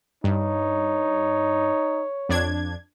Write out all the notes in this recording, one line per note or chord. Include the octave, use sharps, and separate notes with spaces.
G2 D#4 C#5
F2 D4 G#6